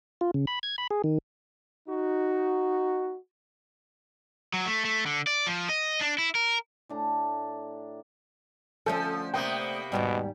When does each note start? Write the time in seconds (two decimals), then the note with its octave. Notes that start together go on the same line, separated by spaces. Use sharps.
0.21 F4
0.34 C#3
0.47 B5
0.63 G#6
0.78 B5
0.91 G#4
1.04 D#3
1.88 D#4 F#4
4.54 F#3
4.66 A3
4.85 A3
5.06 D3
5.27 D5
5.47 F3
5.69 D#5
6.01 D4
6.18 E4
6.35 A#4
6.89 A2 D4 A#5
8.86 D3 F3 A3 C#4 A4 G6
9.34 C3 A#3 B3 G5 D#6 G6
9.92 D#2 G#2 B2 G3